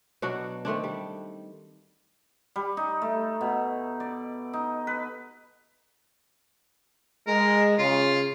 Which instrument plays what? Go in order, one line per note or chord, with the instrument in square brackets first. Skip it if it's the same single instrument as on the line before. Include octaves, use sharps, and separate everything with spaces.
[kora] B2 F#3 D4 F#4
D#3 A3 C4 D4
G3
[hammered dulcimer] G3
D#4
A3
B2
D5
D#4
B4
[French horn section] G#3 [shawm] A#4
[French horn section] C#3 [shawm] F4